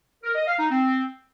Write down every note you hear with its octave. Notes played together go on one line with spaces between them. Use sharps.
A#4
D#5
F5
D#4
C4